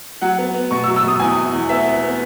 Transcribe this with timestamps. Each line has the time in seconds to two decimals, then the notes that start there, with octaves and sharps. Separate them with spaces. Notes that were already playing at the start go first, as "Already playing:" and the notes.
0.21 F#3 F#5
0.38 B3
0.54 B3
0.71 B2 C#6
0.84 E6
0.88 F#3
0.96 E6
1.04 B2 D#6
1.20 E2 G#5
1.36 E2
1.53 E2
1.69 B3 E5
1.86 B3
2.03 B3